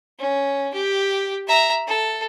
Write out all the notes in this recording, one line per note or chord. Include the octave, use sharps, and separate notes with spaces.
C#4
G4
E5 A#5
A4